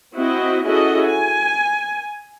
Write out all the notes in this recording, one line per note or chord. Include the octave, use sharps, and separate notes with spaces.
C4 E4 F#4 D#5
C#4 E4 F#4 G#4 A4 D#5
G#5